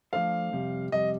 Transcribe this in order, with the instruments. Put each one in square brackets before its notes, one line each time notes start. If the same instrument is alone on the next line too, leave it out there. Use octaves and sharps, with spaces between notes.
[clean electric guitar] F3 A3 D4 A4 C5 [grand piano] F5
[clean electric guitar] F2 C3 G3
[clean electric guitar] F2 C3 G3 [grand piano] D#5